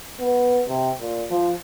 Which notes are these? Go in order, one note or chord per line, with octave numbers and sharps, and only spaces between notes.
B3
C3
A#2
F3